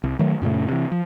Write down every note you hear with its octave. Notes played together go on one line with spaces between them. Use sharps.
C2
D#3 F#3 A3
F#2 A#2 C#3 A3
C3 E3
F3